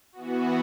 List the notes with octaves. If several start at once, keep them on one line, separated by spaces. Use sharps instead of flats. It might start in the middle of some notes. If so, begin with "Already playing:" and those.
E3 B3 F#4